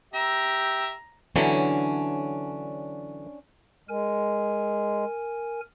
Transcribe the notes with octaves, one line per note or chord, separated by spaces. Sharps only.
G4 E5 A#5
D3 E3 F#3 C#4 D4
G#3 A#4 G#5